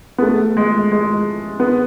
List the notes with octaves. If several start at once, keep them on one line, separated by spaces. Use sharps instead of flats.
B3
A3
G#3
G#3
B3